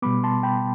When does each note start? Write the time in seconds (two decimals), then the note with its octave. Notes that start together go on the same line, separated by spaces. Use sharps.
0.02 B2 G3 B3 B5 D6
0.24 A5 C6
0.43 G5 B5